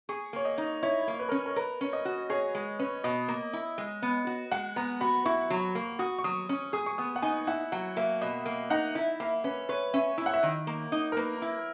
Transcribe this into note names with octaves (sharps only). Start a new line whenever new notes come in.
G#4 C#6
A#3 C#5
D#5
D#4
E4 C#5
A#3
B4
C#4 A#4
A#4
A#4 B4
C#4 C#5
D#5
F#4
G#4 C#5
G#3
C#4 B4
B2 D#5
A#3
E4
G#3
B3
F#4
G#3 F#5
B3 A#5
F#4 B5
E4 C#6
F#3
A#3
F#4 D#6
C#6
F#3 D#6
C#4
G#4 D#6
C#6
B3 D#6
F#5
D#4 G#5
E4 F#5
F#3 F#5
A#3 E5
B2 D#5
A#3
D#4 F#5
E4 E5
A#3 E5
C#4 B4
B4 C#5
C#4 E5
E4 E5
F#5
E5
D#3
A#3
D#4
A#4
A#3 B4
E4